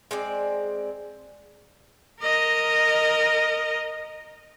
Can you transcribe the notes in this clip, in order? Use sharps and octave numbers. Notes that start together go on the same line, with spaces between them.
G#3 C4 D5
A#4 D#5